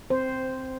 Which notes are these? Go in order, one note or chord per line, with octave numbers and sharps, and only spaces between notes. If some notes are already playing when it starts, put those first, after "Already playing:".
C4 C5